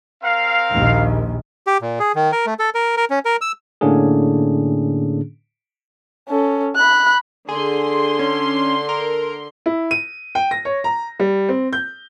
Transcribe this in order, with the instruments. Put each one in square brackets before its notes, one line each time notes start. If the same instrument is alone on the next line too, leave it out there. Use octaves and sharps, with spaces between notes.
[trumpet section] C4 A#4 F5
[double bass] A#1 D#2
[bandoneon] G4
A#2
G#4
D#3
A#4
A3
A4
A#4
A#4
C#4
A#4
E6
[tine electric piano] A2 D3 A#3 C#4 D4 G#4
[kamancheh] C#4 A4
B5 F#6
[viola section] D3 C6 [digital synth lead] G#4
[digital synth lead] C#4
A#4
[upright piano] E4
D#7
G5
A#6
C#5
A#5
G3
C4
G6